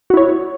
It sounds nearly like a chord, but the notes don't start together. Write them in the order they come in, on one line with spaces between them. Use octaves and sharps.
F#4 E4 C#5